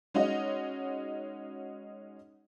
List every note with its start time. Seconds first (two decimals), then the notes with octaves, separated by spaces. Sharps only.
0.14 G#3 C#4 D#4 F#4 D#5